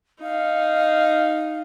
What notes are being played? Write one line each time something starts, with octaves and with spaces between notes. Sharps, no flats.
D#4 F5